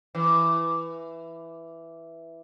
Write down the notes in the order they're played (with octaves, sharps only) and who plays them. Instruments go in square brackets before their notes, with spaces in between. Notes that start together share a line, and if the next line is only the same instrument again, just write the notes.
[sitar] E3